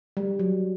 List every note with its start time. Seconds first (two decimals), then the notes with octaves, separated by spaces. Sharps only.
0.17 G3
0.39 F#3